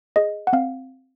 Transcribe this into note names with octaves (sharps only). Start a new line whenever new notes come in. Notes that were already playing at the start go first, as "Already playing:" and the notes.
G#4 D#5
F#5
C4 F5